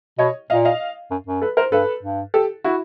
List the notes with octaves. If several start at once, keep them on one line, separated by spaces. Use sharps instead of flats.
B2 C#5 D#5
A#2 D#5 F5
D#5 F5
F#2
F#2
A4 B4
A#4 C5
G2 A4 B4
G2
G4 A4
E4 F#4